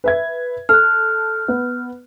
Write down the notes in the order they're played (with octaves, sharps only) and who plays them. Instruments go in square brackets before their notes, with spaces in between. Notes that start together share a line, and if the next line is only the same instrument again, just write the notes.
[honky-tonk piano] B4 E5 G#6
[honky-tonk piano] A4 [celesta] F6 F#6
[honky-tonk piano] B3